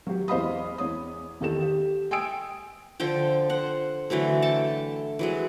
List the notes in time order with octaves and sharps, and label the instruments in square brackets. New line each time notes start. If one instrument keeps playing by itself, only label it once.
[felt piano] F#3 G4
E2 C5 D#5 F5 B5 D#6
E2 C#5 D#6
E2 D#3 G4 A4 E7
G4
G5 G#5 D#6 E6 D7
[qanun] D3 F3 A4 G5
C5 F#5
D3 E3 F#3 A3
A4 G5 A5
E3 F#3 G#3